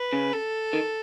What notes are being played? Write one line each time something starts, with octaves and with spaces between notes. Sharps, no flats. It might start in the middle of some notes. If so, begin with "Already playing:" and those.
Already playing: B4
C#3
A4
D#3